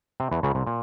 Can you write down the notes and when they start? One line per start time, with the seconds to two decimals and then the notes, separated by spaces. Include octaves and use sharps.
0.20 C3 C4
0.31 E2 E3
0.43 C#2 C#3
0.55 C2 C3
0.67 A#2